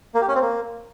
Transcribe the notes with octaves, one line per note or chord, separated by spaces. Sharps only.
A#3
G4
C#4
C4
A#3